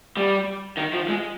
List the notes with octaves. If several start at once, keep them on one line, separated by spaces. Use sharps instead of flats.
G3
D#3
F3
G#3